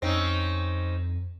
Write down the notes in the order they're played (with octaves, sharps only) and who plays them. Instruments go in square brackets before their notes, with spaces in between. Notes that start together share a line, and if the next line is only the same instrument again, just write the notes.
[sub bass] F2 [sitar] C4 C#4 D#4